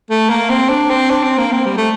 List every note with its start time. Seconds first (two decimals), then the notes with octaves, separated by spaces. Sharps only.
0.10 A3
0.30 A#3
0.50 C4
0.70 D4
0.90 C4
1.11 D4
1.23 C4
1.38 A#3
1.52 C4
1.66 G3
1.77 A3